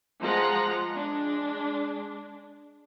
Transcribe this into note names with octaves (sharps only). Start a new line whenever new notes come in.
F3 G#3 F4 F#5 A#5
G#3 D4